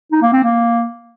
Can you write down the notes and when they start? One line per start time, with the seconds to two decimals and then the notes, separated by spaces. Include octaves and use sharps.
0.12 D#4
0.22 A#3
0.33 C4
0.43 A#3